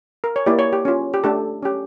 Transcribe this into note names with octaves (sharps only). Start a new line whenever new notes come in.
A#4
C#5
A#3 E4 G4 D5
C#5
G4
C#4 F4
G4
A3 D4 G4 A4
C#4 G4